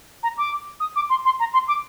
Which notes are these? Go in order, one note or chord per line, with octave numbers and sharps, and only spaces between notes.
A#5
D6
D#6
D6
C6
C6
A#5
C6
D6